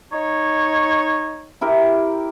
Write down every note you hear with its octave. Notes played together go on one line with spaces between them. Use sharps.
D#4 C#5
E4 G4 A#4